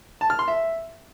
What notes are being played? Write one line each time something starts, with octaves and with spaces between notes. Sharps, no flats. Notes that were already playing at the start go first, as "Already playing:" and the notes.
A5
F6
C6
E5